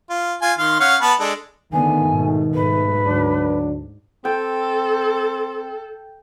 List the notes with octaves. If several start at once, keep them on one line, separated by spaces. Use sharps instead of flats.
F4
F4 G#5
D#3 F5 C6
C#4 F5 F#5
B3 B4 A5
G#3 D4 A4
G#1 D3 D#3 A3 B3 G#5
G#2 B2
B1 G#2 A3 B4
D2 F#3 D4
C4 A4 G5